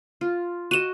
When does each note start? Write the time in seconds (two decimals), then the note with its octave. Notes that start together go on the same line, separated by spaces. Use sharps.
0.21 F4
0.71 F#4 D#5 D#7 E7